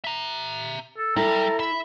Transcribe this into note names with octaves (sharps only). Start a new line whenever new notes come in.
E5 A#5
A4
G3 E4 A4 A#5
E5 B5